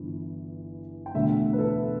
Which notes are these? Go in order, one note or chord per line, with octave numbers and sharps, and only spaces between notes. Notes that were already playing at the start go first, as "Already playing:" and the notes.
Already playing: G1 G2 E3
G5
E1 D2 D3 E5
B4
A4